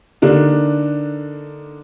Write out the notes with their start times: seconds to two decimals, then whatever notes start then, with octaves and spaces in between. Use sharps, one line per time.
0.22 D3 A#3 D4 D#4 A4